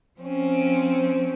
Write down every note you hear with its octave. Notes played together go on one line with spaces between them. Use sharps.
F3 C4 C#4